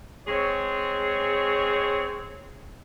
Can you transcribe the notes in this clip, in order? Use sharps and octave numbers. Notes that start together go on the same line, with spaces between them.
G#3 C4 G#4 C#5